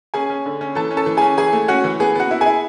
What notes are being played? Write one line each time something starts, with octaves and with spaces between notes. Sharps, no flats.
C#4 G#4 G#5
C#4
D3
C#4
E3 A4 A5
C#4
A4 A5
E3
C#4 G#4 G#5
E3 G#4 G#5
A3
C#4 F#4 F#5
E3
B3 G#4
B3 F#4 F#5
E4
E4 G#4 G#5